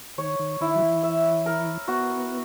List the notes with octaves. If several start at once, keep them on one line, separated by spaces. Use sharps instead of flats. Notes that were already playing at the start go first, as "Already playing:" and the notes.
D#3 C#5
D#3
D#3 E4
F#3
E3
E5
A#4
B3 F#4